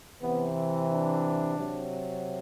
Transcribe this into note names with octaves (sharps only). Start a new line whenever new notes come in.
C3 E3 B3
D4
C3 F#3